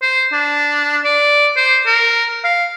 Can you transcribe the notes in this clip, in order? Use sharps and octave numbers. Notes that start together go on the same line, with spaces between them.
C5
D4
D5
C5
A#4
F5